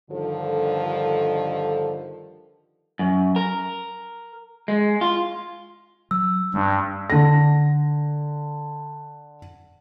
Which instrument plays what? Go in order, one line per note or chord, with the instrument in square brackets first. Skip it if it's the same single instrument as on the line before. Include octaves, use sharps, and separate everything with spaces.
[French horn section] G2 D3 D#3 F3 A4
[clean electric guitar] F#2
A#4
G#3
F4
[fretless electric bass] F#3 [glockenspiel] E6
[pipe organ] G2 [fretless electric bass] G3 G#3 D4
[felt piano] D3 A#6